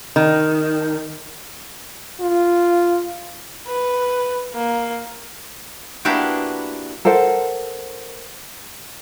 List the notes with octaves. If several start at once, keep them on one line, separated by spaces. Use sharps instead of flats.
D#3
F4
B4
A#3
A#3 B3 D4 E4 F#4 G4
A4 A#4 C5 F#5